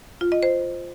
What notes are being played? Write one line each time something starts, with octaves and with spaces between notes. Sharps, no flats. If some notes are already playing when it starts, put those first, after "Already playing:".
F4
D#5
C5